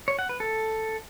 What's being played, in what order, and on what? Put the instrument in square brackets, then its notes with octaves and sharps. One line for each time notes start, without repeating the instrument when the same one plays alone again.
[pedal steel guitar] C#5
F#5
B4
A4